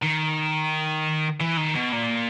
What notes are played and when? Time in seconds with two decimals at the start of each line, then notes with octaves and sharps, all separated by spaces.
0.02 D#3
1.41 E3
1.57 D#3
1.76 B2
1.93 A#2